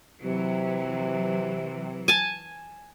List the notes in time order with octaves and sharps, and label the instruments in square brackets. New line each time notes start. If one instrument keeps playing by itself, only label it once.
[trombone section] C3 [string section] E3 F#3
[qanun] G#5 A5